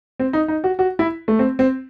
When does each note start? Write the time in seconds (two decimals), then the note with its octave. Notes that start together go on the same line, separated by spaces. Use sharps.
0.20 C4
0.33 D#4
0.48 D#4
0.64 F#4
0.79 F#4
0.99 E4
1.28 A3
1.39 C4
1.59 C4